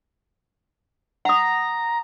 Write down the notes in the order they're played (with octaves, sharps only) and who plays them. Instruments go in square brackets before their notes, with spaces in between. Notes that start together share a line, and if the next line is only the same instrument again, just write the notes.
[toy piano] F#5 D#6 [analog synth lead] A#5